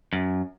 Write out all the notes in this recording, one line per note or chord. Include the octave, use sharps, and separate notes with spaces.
F#2